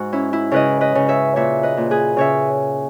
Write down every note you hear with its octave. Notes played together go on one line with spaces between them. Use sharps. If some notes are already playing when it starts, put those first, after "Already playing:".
Already playing: G#2 F#4
C#4 E4
E4
C#3 B4 D#5
B4 D#5
C#3
C#5 E5
A#2 C#5 E5
B4 D#5
A#2
G#4 B4
C#3 C#5 E5